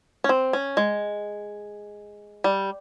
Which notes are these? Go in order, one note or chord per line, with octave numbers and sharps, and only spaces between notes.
C#4
C4
C#4
G#3
G3